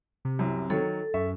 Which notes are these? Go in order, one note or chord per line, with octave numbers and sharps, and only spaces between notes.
C3
C2 F#2
D#3 F#3 A4 C#5
F#2 E5 C#6